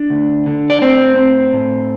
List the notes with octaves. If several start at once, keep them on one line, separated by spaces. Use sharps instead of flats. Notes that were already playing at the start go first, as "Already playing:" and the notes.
Already playing: D4
D2
D3
D5
A2 C4 C5
C4
A2